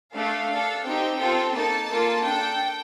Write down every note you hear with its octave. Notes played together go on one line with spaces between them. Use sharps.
A3 D4 A4 F5
D4 A4
C4 D#4 G4 G5
C4 F4 A4
A#3 D#4 A4 A5
A#3 F4 A4
D4 A4 G5